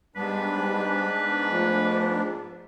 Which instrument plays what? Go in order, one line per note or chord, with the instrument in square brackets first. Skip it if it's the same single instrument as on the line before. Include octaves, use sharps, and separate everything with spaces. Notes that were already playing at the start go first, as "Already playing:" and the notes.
[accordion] G#2 B3 D4 [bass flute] G3 [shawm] B4
[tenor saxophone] F3 [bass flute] A3